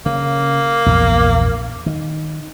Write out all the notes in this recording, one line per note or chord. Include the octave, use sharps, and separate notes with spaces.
C#3 A#3
A#1 E2 G2
D#3